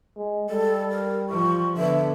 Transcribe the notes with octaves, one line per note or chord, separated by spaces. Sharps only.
G#3
G3 A4
A#4
F3 C#6
D3 B3 E5